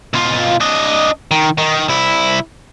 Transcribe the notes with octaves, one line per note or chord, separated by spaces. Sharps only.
B2 F4
D4 D#5
D#3
D#3
C2 E4